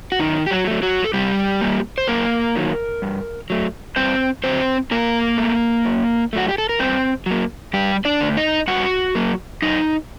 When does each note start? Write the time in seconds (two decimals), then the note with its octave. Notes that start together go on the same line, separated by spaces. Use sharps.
0.12 F#4
0.19 F#2 D#3 D#4
0.46 G4
0.51 F#3 F#4
0.67 F#3 A3
0.82 F#3 F#4
1.04 A4
1.13 C3 G3 G4
1.61 G3 A#3
1.98 C5
2.08 F#2 A#3 A#4
2.55 D#3 F#3 A#3
3.02 G2
3.50 F#3 A3
3.96 G2 C4 C5
4.44 D3 F#3 C4 C5
4.91 A#2 A#3 A#4
5.37 A3
5.85 F#2
6.33 F#3 A3 F#4
6.49 G4
6.58 A4
6.69 A#4
6.79 G2 C4 C5
7.26 F#3 A#3
7.73 G2 G3 G4
8.05 D4 D5
8.21 D3 A3
8.37 D#4 D#5
8.68 G2 F#4 F#5
9.15 F#3 A#3
9.62 F#2 D#4 D#5